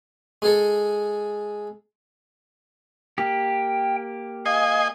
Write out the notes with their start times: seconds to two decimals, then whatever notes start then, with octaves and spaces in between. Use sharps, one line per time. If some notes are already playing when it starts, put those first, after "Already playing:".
0.42 G#3 G#4 A4
3.18 A#3 G4 G5
4.46 D#5 F5 G#5